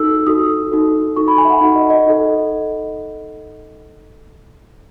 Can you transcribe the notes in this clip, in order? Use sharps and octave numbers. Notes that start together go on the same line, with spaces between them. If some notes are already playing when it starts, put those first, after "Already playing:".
Already playing: D#4 F#4 A4 E6
D#4 F#4 A4 D#6
D#4 F#4 A4
D#4 F#4 A4 C#6
B5
G#5
E5
F#5
D#4 F#4 A4 F#5
D#5
D#5
D#4 F#4 A4